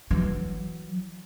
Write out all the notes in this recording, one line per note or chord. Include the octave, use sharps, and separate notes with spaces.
E3 F#3